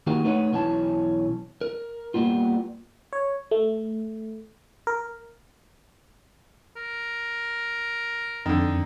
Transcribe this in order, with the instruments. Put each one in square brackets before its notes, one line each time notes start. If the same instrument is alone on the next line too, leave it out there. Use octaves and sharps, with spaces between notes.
[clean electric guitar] D#3 A#3 D#4 F#4 G4 A#4
A3 D#4 B4 C#5 D#5 F#5
B1 E3 C#4 G#5 A5
A#4
G3 A#3 B3 F4
[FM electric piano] C#5
A3
A#4
[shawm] A#4
[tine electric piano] F2 [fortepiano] D3 D#3